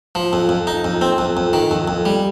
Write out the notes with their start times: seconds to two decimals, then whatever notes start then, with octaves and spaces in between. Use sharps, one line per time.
0.15 F3
0.33 F2
0.49 F2
0.67 D#4
0.84 F2
1.01 C4
1.18 F2
1.37 F2
1.53 D#3
1.71 F2
1.88 F2
2.05 G3